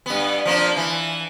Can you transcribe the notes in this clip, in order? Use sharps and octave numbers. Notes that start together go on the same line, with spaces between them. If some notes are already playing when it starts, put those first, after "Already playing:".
G2 B3
F3 A#3 D4
E3